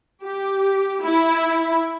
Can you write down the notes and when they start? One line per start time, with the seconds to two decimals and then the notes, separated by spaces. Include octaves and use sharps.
0.23 G4
1.02 E4